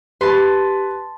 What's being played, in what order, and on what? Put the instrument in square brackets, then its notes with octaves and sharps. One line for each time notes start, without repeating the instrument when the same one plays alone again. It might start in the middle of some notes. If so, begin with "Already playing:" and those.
[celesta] G4 [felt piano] B4 [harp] A5 C6